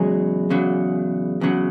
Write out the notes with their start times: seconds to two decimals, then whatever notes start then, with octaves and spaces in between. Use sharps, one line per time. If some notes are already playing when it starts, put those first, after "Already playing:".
Already playing: E2 C#3 F#3 G#3 G#4
0.50 E2 C#3 F#3
1.41 E2 C#3 F#3